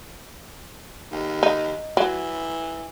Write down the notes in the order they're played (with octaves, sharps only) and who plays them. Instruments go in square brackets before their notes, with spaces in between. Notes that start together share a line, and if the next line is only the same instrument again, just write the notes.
[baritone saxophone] D#2
[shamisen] D#4
[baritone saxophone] E3 [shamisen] F#3